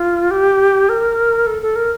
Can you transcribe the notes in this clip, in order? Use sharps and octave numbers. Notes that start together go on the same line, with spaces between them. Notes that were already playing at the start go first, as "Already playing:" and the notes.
Already playing: F4
G4
A#4
A4
A4
A#4